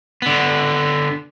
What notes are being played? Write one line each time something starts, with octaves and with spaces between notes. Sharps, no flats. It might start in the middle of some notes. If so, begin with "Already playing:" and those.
D3 B3